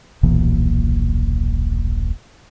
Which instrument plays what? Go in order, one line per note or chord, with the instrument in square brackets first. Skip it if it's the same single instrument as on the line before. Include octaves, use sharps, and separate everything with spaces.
[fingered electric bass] D#1 B1 A#2 E3